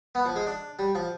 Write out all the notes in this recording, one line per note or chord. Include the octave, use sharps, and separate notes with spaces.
B3
F3
G#3
D4
G3
F3